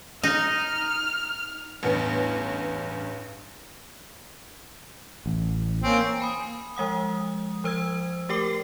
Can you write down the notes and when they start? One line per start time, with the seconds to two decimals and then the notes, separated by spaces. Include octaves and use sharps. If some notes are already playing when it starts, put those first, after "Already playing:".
0.23 D#4 F6
1.83 A1 E2 G2 B3 C#7
5.26 A1
5.83 A#3 C4 C#4
6.20 G#5 B5 D#6
6.76 F3 G#3 F#5 D#6
7.64 F3 C5 E6 G#6
8.29 A3 G4 A#4 G5 D6 C7